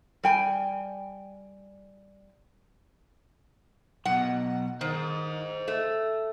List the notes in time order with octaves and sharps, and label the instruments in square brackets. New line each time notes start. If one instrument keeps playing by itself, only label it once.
[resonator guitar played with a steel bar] G3 G5 G#5
[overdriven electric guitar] B1 B2 [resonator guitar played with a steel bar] F#5
[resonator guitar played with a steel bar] D#3 [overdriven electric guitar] C5 D#5
[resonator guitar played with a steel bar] A3